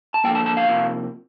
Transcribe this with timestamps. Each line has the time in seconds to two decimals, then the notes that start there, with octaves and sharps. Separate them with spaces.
0.14 A5
0.24 D3 F3 A#3 G5
0.35 A5
0.46 A5
0.57 F5
0.67 C3 F3 A#3